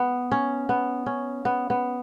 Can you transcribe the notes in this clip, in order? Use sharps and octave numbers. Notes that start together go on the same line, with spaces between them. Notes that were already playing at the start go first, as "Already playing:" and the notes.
Already playing: B3
C#4
B3
C#4
B3
B3